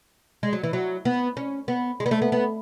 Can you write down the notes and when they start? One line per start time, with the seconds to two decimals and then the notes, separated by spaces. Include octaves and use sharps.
0.43 G#3
0.53 F#3
0.63 E3
0.73 F#3
1.05 B3
1.37 C#4
1.68 B3
2.00 G#3
2.06 B3
2.11 A3
2.22 B3
2.32 B3